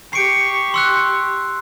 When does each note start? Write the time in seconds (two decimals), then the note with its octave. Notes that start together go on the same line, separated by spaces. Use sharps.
0.13 G4 C#6 C7 D7
0.74 C6 E6 F#6